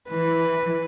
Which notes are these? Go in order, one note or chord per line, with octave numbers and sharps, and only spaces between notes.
E3 B4